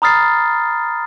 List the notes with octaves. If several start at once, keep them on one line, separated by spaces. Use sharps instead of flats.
A#5 B5 D#6 F6 A6 C7